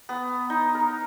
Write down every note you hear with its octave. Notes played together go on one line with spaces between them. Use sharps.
B3
D#4
A#4